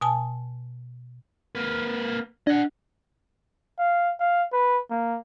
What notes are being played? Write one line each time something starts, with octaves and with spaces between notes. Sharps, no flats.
B2 G#5 A5
A#3 B4
D4 D#5 F#5
F5
F5
B4
A#3